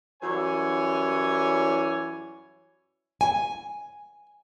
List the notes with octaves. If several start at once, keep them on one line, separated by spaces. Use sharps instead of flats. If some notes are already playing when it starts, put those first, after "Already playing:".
F#2 E3 G3 C#5 G#5
G#5